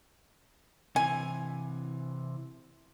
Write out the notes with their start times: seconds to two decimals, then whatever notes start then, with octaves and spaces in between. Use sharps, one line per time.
0.96 C3 E3 G#5